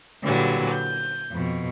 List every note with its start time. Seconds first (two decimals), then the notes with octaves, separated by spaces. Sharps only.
0.24 A#2 D3 E3 F#3 G3
0.71 G6
1.31 F2 B2